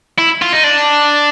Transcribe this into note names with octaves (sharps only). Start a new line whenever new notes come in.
E4
F4
D#4
D4